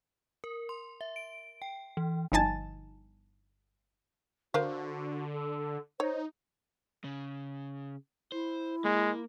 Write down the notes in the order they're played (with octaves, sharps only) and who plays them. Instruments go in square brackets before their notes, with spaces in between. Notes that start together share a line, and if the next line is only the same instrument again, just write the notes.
[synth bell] A#4
C6
E5
D7
G5
E3
[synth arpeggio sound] G1 F3 D#4 G#5 A5 A6
[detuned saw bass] D3 [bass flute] F#4 [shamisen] A#4 C5 F5
[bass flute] A4
[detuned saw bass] D#4 [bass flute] C5 [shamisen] C#5
[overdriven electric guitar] C#3
[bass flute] E4 [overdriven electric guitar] C5
[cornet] G#3 [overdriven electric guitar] A#3